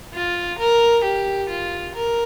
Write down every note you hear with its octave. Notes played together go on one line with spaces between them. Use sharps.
F4
A#4
G4
F4
A#4